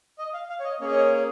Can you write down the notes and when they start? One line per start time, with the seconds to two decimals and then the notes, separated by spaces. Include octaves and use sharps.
0.19 D#5
0.33 F5
0.49 F5
0.60 C#5
0.65 D#5
0.80 A#3 C#4 G#4 C#5
0.91 D#5
0.95 C#5
1.11 C#5